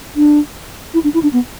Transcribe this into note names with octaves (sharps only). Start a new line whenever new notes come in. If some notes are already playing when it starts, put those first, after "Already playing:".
D4
E4
D4
E4
D4
B3